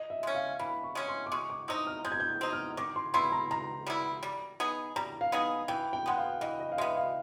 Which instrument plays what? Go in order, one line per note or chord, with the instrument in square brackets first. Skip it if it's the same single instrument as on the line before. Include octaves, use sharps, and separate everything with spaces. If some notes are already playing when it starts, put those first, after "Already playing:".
Already playing: [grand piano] D#5
E5
[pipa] G#3 C#4
[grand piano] F5
[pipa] E3 [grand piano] B5
[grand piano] C#6
[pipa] G#3 C#4
[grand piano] C6
D6
[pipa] G#3 [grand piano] C#6
[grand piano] D6
[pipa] C4 D#4 [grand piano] D#6
[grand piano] F6
[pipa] G#3 [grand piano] G6
[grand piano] G#6
G6
[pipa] C4 D#4
[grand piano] F6
[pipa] D#3 [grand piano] D6
[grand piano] C6
[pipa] G3 B3 E4 [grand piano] C6
[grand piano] A#5
[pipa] D#3 [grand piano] A#5
[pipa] G3 B3 E4
G3
B3 D#4 G#4
[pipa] G3 [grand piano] A#5
[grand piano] F5
[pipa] B3 D#4 G#4
[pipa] E3 [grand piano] G5
[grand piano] G5
[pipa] G#3 B3 [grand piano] F#5
[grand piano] F5
[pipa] E3 [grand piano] D#5
[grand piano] D#5
F5
[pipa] G#3 B3 [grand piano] E5
[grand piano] F5